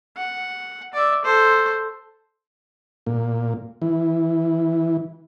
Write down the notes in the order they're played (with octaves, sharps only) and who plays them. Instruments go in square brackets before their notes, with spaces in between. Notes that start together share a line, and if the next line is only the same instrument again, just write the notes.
[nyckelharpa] F#5
D5 E5
A4 C5
[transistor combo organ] A#2
E3